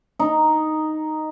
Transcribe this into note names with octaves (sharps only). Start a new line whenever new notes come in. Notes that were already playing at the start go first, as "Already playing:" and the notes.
D#4